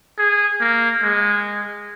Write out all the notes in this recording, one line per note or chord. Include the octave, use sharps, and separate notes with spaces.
G#4
A#3
G#3